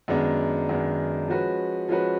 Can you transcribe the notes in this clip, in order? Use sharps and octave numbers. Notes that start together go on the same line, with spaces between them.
F#2 D#3 G#3 B3 D4
F#2 D#3 G#3 B3 D4
F3 G#3 C#4 F#4 B4
F3 G#3 C#4 F#4 B4